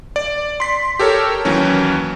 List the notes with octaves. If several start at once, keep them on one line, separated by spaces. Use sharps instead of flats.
D5
C6 B6
G4 A4 A#4 C#5
D#2 E3 F#3 C#4